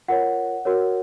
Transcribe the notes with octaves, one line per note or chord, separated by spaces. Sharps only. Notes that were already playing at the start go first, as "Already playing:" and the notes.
F4 A#4 C#5 F#5
F#4 A#4 C#5